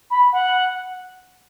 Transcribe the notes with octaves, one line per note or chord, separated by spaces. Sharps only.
B5
F#5